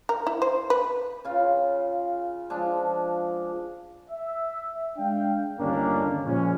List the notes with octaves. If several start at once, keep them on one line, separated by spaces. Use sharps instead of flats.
A#4
E4
C5
B4
C#3 F4
F3 G#3 D4
E5
G#3 D4 F5 G5
G1 D#2 A#3 C#4 D4
A#2 F3 G#3 C#4